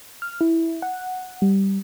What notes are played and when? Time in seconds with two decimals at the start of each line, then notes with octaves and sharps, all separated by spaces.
0.22 F6
0.41 E4
0.82 F#5
1.42 G3